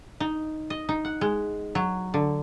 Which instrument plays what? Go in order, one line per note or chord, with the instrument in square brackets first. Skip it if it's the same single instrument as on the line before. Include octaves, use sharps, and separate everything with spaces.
[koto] D#4
D#5
D#4
F#5
G#3
F#3
D3